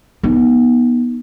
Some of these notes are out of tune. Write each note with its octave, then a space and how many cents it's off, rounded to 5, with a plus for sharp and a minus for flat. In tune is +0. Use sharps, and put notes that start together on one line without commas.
B3 -25 D#4 +0